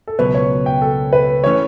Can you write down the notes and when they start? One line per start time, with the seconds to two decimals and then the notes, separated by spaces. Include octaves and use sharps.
0.07 A4
0.19 C#2 B2 F#3 B4
0.34 C#5
0.66 G5
0.81 A4
1.13 B4
1.44 E3 A3 C#4 C#5